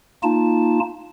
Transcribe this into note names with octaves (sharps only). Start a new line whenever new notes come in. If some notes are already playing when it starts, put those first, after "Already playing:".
A#3 D#4 F4 A5